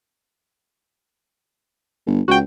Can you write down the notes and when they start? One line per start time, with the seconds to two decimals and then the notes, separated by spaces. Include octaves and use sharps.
2.06 G1
2.28 C#2 F#4 G5